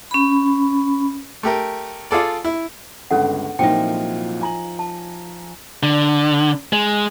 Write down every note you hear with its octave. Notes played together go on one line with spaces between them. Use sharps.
C#4 B5
A3 G4 A#4
F4 G#4 A4 D5
E4
G1 C#2 C#4 A4 F#5
C2 A#2 F3 F#3 D#4 G5
G#5 A#5 F#7
A5
D3
G#3